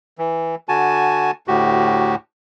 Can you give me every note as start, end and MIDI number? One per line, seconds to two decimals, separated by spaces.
0.18 0.55 52
0.69 1.31 50
0.69 1.31 66
0.69 1.31 80
0.69 1.31 81
1.48 2.15 38
1.48 2.15 45
1.48 2.15 66
1.48 2.15 67